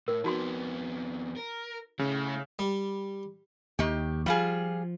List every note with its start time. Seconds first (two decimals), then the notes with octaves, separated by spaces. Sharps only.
0.08 A2 A#4
0.24 F2 B3 D#4 F#4 C6
1.37 A#4
1.99 C#3 A3 E4
2.59 G3
3.79 D#2 D#3 G4
4.26 F3 G3 F4 G#4